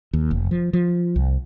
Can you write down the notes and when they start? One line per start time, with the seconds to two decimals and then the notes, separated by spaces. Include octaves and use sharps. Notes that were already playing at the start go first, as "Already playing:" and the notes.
0.13 D#2
0.31 F1
0.51 F3
0.73 F3
1.16 C2